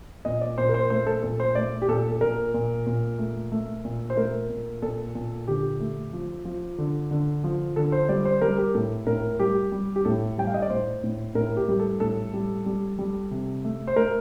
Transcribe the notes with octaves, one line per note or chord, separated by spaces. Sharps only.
A#2 D#5
D5
A#2 C5
A#4
C5
A3 C5
A4
A#2 A4
C5
A3 D5
G4
A#2 A4
A4
A#2 A#4
A#2
A#2
A3
A3
A#2
C5
A3 A#4
A#2
A#2 A4
A#2
D3 G4
A3
F3
F3
D3
D3
F3
D3 A4
C5
G3 D5
C5
G3 A#4
G4
A2 A4
A2 A#4
G3 G4
G3
G4
A2 A4
G3 G5
F5
D#5
D5
A2 C5
A2
A2 A#4
G4
G3
A4
A2 A4
G3
G3
G3
C3
A3
C5
A3 A#4